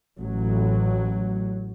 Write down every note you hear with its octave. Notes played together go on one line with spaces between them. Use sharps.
A1 F#3